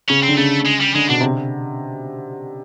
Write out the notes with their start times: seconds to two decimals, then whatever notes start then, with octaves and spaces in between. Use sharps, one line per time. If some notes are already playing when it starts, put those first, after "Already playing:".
0.09 C#3 C#4
0.23 C4
0.28 D3
0.38 C#3 A3
0.66 G#3
0.81 G3
0.95 D3 G#3
1.09 B2 D4
1.21 C3